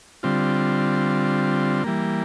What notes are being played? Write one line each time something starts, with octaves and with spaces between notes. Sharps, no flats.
D3 G3 C4 F4
E3 G3 A#3